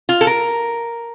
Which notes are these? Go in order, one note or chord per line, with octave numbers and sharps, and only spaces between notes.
F4
A4
A#4